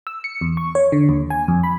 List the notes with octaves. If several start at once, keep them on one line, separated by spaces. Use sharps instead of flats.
E6
C#7
E2
C#6
C#5
D3
D#2
G#5
F2
B5